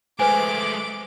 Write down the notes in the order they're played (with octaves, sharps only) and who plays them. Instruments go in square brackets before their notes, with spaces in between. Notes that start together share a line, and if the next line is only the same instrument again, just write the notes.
[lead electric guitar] G#3 A3 [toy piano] B4 C5 G#5 [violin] D6